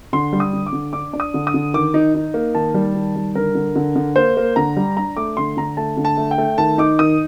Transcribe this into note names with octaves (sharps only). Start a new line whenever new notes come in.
D3 C6
G3
D#6
D3
D6
D3
D4 D6
D4
D#6
D3
D#6
D3
D#3 D6
D#4
D#4
A#3
D#3 A5
G3
D#3
G3
D3 A#4
D3
D3
D3
A#3 C5
A#3
D3 A#5
G3
D4 A#5
A3 D6
D3 C6
D3 A#5
A3 A5
D3
A5
A3
G5
A3
D#3 A5
D#4 D6
D#3 D#6